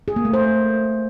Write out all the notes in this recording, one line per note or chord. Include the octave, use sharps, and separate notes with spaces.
G#4
A#3
A3
C5